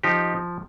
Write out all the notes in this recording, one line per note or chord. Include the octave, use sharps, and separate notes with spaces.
F3 D#4 G4